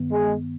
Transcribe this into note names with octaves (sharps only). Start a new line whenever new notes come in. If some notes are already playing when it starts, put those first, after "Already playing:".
Already playing: G2 D#3 B3
G#3